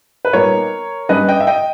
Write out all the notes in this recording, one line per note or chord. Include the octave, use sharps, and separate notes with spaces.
B4
A#2 G3 B3 D#4 A#4 C#5
G2 G3 C#4 B4 D#5
D#5 G5
E5
D#5 G5